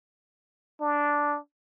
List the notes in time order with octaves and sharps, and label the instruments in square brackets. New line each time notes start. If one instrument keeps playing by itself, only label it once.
[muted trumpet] D4